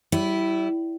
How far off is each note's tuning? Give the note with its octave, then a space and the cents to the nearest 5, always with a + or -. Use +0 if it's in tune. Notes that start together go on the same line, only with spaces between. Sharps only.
G3 -30 E4 -5